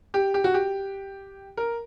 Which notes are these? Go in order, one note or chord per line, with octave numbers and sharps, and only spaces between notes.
G4
G4
F#4
G4
A#4